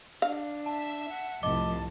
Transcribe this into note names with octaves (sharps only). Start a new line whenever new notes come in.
D4 F5
E5 A5
F#5
C2 F2 A2 D#5 A5 D6 G7